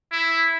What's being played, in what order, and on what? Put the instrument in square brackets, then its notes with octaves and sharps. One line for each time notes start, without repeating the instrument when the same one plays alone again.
[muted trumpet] E4